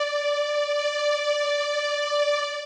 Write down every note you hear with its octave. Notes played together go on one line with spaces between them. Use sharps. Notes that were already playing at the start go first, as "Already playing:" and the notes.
Already playing: D5
D5